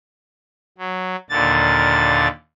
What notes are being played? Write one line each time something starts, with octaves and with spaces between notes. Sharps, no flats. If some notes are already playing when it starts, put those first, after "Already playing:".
F#3
D#2 A#2 D3 A6